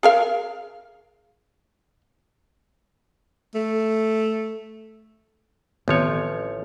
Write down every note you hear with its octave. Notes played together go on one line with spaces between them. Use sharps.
G#4 A#4 F5
A3
A1 D#3 F3 B3 C4 C#5